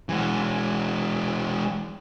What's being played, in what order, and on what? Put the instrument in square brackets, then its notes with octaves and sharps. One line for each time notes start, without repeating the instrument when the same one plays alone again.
[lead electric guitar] E3 G#3